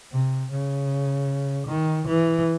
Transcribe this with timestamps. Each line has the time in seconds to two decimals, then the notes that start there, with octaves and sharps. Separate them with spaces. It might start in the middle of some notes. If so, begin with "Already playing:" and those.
0.12 C3
0.51 C#3
1.67 D#3
2.07 E3